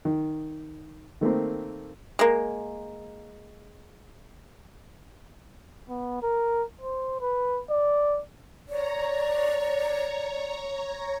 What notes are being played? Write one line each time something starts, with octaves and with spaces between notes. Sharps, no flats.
D#3
D#3 A3 A#3 C4
G#3 A#3
B3
A#4
C5
B4
D5
C#5 D5 A#5